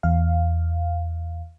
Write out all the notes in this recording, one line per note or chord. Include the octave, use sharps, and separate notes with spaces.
E2 F5